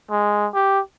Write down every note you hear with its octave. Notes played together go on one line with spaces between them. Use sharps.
G#3
G4